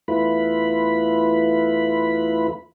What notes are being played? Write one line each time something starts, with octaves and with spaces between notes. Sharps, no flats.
E2 A3 E4 F4 B4 B5